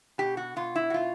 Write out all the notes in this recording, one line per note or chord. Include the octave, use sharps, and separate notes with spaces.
B2 G4
F#4
B2 F4
E4
F#4
B2 F4